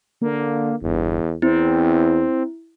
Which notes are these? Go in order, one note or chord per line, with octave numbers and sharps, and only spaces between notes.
D3 A#3
G1 E2
E2 C4 E4